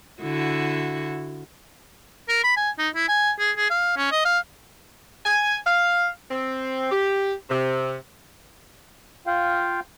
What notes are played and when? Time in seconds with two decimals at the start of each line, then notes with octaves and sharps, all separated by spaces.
0.22 D3 E4 F#4
2.29 A#4
2.44 B5
2.57 G#5
2.79 D#4
2.95 E4
3.09 G#5
3.39 G#4
3.57 G#4
3.70 F5
3.97 C#4
4.12 D#5
4.25 F5
5.25 G#5
5.67 F5
6.31 C4
6.91 G4
7.50 C3
9.27 F4 F5 G5